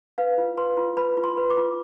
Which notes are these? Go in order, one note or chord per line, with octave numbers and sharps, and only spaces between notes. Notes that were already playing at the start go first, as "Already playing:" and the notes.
B4 F5
F4
B4 C6
F4
B4 B5
F4
C6
B4
D6
F4